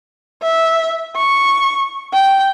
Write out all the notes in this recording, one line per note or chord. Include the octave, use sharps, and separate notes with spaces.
E5
C#6
G5